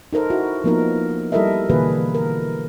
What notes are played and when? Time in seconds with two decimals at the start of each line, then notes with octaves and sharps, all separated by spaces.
0.13 D#4 A4 A#4 C5
0.30 E4 F#4
0.64 F3 A#3 B3 D#4 A#4
1.32 G3 E4 A4 A#4 D#5 E5
1.70 B2 D3 E3 A#3 G#4 B4
2.15 A#4